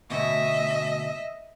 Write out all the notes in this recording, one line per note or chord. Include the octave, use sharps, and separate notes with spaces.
D2 B2 D#5 E5